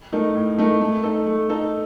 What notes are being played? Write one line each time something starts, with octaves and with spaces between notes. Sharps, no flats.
A3 D#4 A#4
A2
A3 D#4 A#4
A3
D#4 A4
A3
D#4 A4